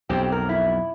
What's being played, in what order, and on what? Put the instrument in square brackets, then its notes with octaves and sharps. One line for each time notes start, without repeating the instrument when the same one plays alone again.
[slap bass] B1 F2 [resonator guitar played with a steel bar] C4 G4
[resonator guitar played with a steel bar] A#4
E4